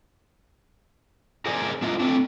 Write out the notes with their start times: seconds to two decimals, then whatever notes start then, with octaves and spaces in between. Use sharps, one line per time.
1.46 G#4 A#4 C5 D5 D#5 G#5
1.82 A#3 D4 E4 F4 D#5
1.99 A3 C4 D4